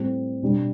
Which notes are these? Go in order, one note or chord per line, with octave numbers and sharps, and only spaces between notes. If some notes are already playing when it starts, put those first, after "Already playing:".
Already playing: A2 G3 C4 G4
B2 G3 D4 G4